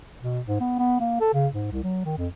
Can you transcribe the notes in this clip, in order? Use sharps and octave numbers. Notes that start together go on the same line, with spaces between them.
B2
G#2
B3
B3
A#3
A4
C#3
G#2
C2
F#3
D#3
F2